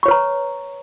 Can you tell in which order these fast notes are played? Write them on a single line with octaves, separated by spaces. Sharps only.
C#6 C#5 B4 A#5